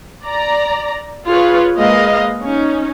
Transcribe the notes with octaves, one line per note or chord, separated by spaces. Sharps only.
D5 A#5
F4 G#4 B4 C#5
G#3 A#3 B4 D#5 F5
C#4 D#4